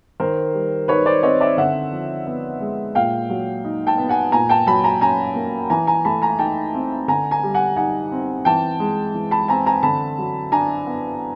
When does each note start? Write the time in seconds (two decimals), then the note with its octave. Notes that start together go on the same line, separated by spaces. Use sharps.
0.20 D#3 A#4 C5
0.54 G3
0.88 D#4 B4 C#5
1.06 C5 D5
1.23 C4 C#5 D#5
1.41 D5 E5
1.57 D3 E5 F#5
1.92 F3
2.27 B3
2.60 G#3
2.95 A#2 F5 G5
3.30 F#3
3.65 D#4
3.87 G5 A5
3.98 B3
4.09 F#5 G#5
4.32 A#2 G#5 A#5
4.49 G5 A5
4.67 F#3 A5 B5
4.84 G#5 A#5
5.01 C#4 G#5 A#5
5.35 A#3
5.70 E3 G#5 A#5
5.87 G#5 A#5
6.05 A3 A5 B5
6.22 G#5 A#5
6.39 D#4 G5 A5
6.74 C4
7.08 D3 G#5 A#5
7.31 G#5 A#5
7.43 G3
7.55 F#5 G#5
7.76 D#4 F#5 G#5
8.11 C4
8.45 E3 G5 A5
8.80 G#3
9.14 E3
9.31 A5 B5
9.48 C4 G#5 A#5
9.66 G#5 A#5
9.83 D3 A5 B5
10.18 F#3
10.52 D4 G#5 A#5
10.87 B3